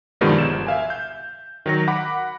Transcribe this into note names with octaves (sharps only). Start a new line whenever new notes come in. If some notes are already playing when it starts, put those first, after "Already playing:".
G2 B2 D#3 F3 G3 G#3
G1 E7
E5 F5 G#5
G6
D#3 F#3 C#5 A#6
F#5 B5 D6